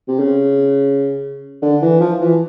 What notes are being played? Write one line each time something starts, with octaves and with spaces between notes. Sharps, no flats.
C3
C#3
D3
E3
F3
E3